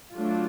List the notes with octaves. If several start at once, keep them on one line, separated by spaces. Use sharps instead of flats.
F#3 A3 D4 F4